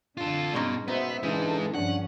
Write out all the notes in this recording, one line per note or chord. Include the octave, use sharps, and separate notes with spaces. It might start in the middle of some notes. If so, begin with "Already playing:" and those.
D3 D4 F4 A4
G2 B2 G#3 C#4 D#4
B2 B3 D#4 B4 C5 E5
C#3 E3 G#3 D4 D#4 A4
G2 F3 C#4 D4 F#5